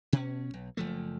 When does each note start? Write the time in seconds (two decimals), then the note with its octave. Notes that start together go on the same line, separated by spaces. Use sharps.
0.13 B2 C#4
0.54 B1
0.77 F#1 F3 A3